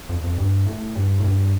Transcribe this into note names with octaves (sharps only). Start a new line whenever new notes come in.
F2
F2
G2
A2
G2
A2
G2